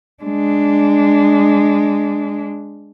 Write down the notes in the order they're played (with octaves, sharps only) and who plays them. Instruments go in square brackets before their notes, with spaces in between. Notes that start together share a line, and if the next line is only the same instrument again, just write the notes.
[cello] G#3 D4